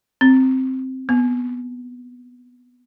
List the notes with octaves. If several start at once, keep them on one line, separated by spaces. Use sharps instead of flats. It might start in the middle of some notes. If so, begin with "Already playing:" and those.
C4
B3